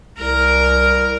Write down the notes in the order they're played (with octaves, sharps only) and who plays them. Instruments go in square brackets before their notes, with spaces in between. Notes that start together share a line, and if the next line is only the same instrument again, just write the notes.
[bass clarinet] C2 [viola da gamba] A#4